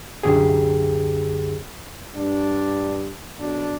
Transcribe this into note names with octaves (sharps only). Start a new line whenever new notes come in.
C2 F#2 D3 G4 G#4
G2 D4
B1 D4